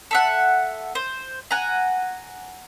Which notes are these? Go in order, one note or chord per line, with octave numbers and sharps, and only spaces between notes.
A4 E5 F#5
C5
F#5 G#5 A#5